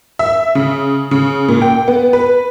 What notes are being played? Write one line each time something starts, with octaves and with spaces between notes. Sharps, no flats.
E5
C#3
C#3
A#2
G5
B3
B4